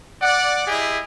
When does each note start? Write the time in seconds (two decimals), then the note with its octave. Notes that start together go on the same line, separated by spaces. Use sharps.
0.21 D5 F#5
0.67 E4 G4 G#4 D#5